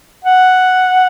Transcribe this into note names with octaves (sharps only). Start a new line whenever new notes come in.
F#5